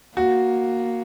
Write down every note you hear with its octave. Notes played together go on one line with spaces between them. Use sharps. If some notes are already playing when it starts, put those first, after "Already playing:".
A#3 F#4